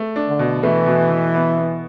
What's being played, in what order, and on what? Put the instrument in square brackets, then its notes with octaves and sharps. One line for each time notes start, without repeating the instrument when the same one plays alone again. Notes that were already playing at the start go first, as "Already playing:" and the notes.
Already playing: [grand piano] A3
D4
[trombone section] D3
[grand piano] B2
[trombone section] E3 [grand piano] A3
[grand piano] B2
B2
B3
B3